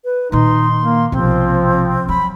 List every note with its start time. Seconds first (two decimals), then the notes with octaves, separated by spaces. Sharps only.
0.05 B4
0.32 A#2 D#3 D#4 C6
0.80 A#3
1.12 B1 C3 F3 C4
2.09 F#3 B5